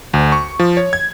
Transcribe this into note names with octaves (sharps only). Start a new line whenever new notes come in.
D2
C#6
F3
C#5
G#6